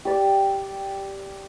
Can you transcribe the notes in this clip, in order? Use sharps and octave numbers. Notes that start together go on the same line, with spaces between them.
G4 D5